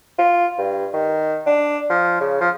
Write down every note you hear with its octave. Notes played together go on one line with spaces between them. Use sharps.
F4
G2
D#3
D4
F3
C#3
F3